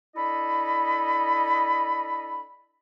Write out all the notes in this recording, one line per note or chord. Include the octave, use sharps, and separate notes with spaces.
D4 E4 A4 D#5 B5